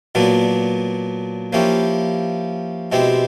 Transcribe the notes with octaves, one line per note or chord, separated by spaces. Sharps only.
A#2 F#3 B3 D4
F3 A#3 C#4 E4 G4
B2 G#3 C4 E4 G4